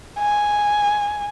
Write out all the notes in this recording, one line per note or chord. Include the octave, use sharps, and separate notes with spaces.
G#5